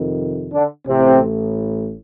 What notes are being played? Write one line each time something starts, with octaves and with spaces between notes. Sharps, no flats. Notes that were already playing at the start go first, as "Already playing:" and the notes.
Already playing: F2 C3 D#3
D3 D4
A1 A2 C3 C4